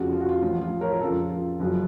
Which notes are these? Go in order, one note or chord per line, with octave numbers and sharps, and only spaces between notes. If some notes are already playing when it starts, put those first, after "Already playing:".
Already playing: F1 F2 C#3 F3 F#4
F4
F#4
F4
A1 A2 F3 F4
F4
A#4 C#5
A#4
F2 C#3 F3 F4 A4
F4
F#1 F#2 F3